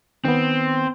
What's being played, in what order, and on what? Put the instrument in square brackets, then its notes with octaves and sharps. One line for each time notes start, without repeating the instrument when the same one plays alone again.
[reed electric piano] D#3 B3 [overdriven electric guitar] C4